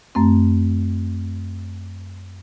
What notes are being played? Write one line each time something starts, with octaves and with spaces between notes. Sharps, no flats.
F#2 A3 C4